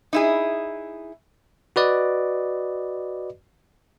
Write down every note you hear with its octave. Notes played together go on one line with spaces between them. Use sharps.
D#4 E4 G#4
F#4 B4 D5 D#5